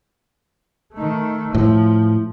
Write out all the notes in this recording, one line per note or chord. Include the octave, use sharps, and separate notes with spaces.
D#3 A3
A2 F3